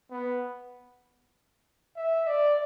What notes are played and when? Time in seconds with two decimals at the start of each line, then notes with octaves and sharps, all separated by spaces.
0.11 B3
1.96 E5
2.27 D5